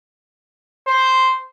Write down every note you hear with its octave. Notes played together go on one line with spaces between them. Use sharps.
C5